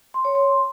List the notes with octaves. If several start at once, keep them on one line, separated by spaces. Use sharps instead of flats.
C6
C#5
C6